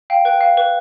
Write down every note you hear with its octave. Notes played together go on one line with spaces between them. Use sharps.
F5 G5
B4 G5
F5
B4